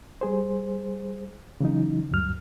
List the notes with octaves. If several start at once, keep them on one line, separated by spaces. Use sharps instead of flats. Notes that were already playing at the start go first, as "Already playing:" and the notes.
G3 G#4 C5
C#3 E3 F#3 D#4
D2 G2 F#3 F6